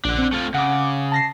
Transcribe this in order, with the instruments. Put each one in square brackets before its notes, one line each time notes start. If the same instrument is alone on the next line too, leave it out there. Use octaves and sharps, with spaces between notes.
[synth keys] A#1 [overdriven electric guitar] D4 F#5
[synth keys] C4
[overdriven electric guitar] A3 F4
[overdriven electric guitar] C#3 [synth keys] F#5 D6
[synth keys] A5 A#6 C7